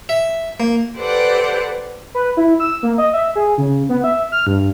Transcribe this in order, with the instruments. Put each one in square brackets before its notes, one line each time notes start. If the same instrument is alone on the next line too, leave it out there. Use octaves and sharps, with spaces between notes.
[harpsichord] E5
A#3
[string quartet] G4 A4 B4 C5 D5 F#5
[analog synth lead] B4
E4
E6
A#3
D#5
E5
G#4
C#3
B3
E5
F6
G2